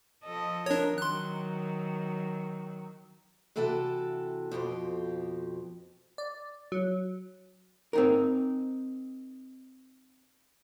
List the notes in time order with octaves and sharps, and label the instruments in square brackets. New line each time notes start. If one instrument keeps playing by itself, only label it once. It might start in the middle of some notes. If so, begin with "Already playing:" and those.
[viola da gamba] F3 A4 D#5
[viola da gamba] F2 A#4 [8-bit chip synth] D4 C#5
[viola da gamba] D#3 F#3 [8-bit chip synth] C6 F#6
[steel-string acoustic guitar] C3 E3 F#4 A4 G5 A5
F2 B2 G4 C5
[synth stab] D5
F#3
[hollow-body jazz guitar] C4 D#4 A#4